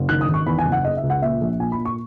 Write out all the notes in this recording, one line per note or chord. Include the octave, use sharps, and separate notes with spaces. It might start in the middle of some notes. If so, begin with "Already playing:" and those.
Already playing: F#1
D#3 F#6
D#6
G#1
C#6
E2 B5
G#5
F#1
F#5
C#3 D#5
E5
C#2
F#5
A#2 E5
A#1
A#2 G#5
B5
A#2
C#6